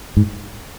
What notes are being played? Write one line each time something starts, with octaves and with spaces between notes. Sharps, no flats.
G#2